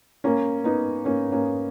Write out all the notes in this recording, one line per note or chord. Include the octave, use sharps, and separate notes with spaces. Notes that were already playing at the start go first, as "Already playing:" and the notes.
A#3 C#4
B3 D#4
A#3 C#4
A#3 C#4